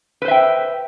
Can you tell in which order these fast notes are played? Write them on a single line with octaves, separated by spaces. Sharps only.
B4 C5 E5 G5